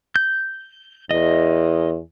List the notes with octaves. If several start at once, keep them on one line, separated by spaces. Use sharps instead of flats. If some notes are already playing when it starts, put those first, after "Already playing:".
G6
E2 D#5